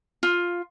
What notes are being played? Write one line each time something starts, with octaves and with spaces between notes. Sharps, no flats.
F4